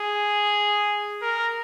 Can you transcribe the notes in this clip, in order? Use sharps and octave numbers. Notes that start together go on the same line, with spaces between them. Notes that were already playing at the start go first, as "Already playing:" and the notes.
Already playing: G#4
A#4